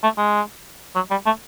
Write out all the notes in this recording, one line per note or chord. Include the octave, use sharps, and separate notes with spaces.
A3
G#3
F#3
G3
A3